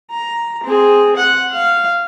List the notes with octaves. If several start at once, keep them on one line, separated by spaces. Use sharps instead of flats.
A#5
C4 G#4
F#5
F5